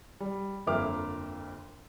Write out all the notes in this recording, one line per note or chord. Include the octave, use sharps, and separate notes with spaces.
G3
G1 F2 A#3 E5 D6 F6